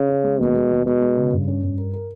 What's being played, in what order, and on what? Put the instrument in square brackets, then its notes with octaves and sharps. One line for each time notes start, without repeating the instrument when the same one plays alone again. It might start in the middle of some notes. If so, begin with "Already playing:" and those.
Already playing: [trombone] C#3
[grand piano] C#4
G#3
[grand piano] D#2 [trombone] B2
[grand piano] G#3
D#2
[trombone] B2 [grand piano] G#3
[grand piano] G#3
C#3
G2
C#4
G2
A#4
A#4